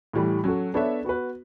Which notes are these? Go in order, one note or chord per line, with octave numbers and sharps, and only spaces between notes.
A2 E3 G3
F#3 C#4 F#4 A4
B3 D4 A4 C#5 E5
B3 F#4 B4